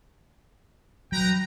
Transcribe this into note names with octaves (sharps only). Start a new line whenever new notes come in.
F#3 B4 G5 A#5